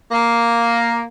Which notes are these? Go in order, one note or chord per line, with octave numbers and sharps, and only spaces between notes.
A#3